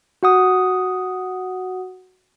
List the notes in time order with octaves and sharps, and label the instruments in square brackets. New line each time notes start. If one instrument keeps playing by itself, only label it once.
[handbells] F#4 F#5 D#6